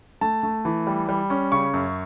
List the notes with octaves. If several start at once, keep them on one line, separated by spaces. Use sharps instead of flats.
A3 A5
A3
E3
G3
G3
C#4
C#3 C#6
F#2